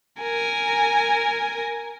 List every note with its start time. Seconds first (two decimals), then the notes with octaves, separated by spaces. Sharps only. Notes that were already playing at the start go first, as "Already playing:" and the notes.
0.22 A#4 G#5